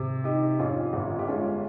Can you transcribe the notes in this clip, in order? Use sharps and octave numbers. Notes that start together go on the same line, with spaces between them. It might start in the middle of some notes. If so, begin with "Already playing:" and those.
Already playing: C3
D#3 D#4 G4
F2 C#4 F4
G1
G4
G#3 C#4 F4